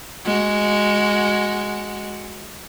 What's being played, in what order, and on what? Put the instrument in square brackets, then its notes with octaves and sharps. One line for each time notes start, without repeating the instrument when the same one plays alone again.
[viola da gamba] G#3 F#4